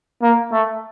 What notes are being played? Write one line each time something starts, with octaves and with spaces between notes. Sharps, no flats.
A#3
A3